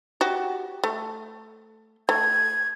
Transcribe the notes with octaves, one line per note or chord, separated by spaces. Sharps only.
F#4 G4
A3
A3 G#6